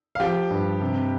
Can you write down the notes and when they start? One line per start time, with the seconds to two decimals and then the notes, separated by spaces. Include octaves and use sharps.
0.15 F5
0.20 F3 G4 G5
0.51 G2
0.81 C3